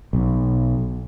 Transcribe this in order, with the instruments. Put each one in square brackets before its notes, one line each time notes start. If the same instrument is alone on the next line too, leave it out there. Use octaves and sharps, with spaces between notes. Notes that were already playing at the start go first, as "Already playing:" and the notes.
[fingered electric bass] B1